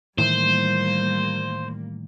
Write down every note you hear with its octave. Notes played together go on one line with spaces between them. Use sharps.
A2 D#3 E3 G3 A#3 C5